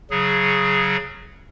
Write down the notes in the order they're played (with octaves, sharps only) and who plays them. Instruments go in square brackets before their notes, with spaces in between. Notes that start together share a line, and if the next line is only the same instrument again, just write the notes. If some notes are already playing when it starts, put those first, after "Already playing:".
[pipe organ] C#3 F#3 G#4